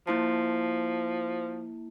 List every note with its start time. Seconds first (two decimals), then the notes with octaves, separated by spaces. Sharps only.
0.07 F3 A#3 E4 A5